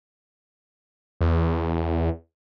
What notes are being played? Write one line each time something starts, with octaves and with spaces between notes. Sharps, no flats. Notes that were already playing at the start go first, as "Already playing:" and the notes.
E2